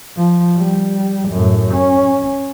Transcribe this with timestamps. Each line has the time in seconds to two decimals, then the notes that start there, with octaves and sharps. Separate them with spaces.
0.17 F3
0.57 G3
1.29 F#2 A2
1.72 C#4